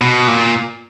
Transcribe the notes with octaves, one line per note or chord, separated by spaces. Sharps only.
B2
A#2